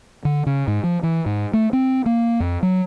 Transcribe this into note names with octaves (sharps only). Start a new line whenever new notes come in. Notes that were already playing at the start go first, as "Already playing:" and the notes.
D3
C#3
G#2
F3
E3
G#2
A3
C4
A#3
F2
F#3